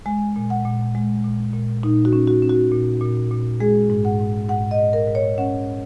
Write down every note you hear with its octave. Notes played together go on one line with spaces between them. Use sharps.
G#3 G#5
A#2
F#5
A#2
G#3
A#2
A#2
A#2 D#4
F#4
C#4
F#4
C#4
F#4
A#2
A#2
A#2
G#3 G#4
G#2
F#5
G#2
G#2 F#5
D#5
G#2
A#4
G#2
C#5
C#4 F#5